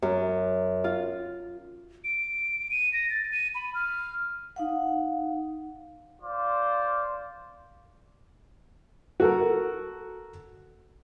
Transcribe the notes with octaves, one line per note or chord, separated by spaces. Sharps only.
F#2
F4
D7
D#7
A#6
A6
D#7
B5
F6
D#4 F5 F#5
F4 C5 D5
F#4 A4 A#4